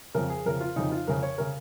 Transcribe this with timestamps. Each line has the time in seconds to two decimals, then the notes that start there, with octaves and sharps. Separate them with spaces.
0.14 F2 C#3 A#4
0.29 G#4
0.46 F2 C#3 A#4
0.60 F4
0.76 F2 C#3 D#4
0.92 F4
1.07 F2 C#3 A#4
1.23 C#5
1.38 C#3 A#4